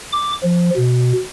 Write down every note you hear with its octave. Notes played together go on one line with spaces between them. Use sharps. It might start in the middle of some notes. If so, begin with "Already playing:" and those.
D6
F3
B2